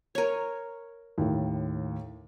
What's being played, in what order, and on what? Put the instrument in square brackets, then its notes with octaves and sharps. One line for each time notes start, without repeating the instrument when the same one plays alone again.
[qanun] A#4 C#5
[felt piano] D#2 A2